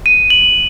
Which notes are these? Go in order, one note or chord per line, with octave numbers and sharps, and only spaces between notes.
D#7
F#7